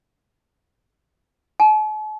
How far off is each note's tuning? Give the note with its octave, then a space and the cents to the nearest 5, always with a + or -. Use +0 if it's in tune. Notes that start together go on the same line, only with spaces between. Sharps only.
A5 -45